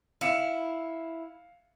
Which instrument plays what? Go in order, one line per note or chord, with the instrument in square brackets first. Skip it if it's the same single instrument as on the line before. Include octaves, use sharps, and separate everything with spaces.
[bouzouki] E4 [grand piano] F5 C#7 E7